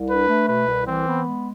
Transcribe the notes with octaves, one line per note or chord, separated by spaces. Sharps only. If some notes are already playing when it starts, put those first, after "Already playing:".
Already playing: C2
D4 B4
A3
B2 B4
C2
E3 C4
B3
G#3